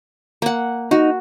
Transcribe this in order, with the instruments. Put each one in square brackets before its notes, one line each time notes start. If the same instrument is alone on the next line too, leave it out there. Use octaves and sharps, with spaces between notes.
[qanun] A#3 F#5
[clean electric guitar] D#4 [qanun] F#4